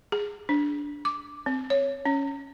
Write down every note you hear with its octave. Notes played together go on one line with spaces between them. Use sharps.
G#4
D4
D6
C4
C#5
C#4